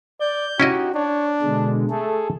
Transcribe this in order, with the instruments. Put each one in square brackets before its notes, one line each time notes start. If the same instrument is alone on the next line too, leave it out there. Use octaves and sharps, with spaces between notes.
[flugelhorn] D5 [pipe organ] G6
[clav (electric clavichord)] C#4 E4 D#5 [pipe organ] D#4 G4 [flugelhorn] F#4
[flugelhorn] D4 [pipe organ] C#5
[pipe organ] B2 D3 G#3
[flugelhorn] A3 [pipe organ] G#4 A4